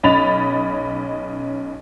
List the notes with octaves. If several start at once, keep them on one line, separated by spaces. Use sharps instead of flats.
B1 C#4 D#5 B5 A6 F7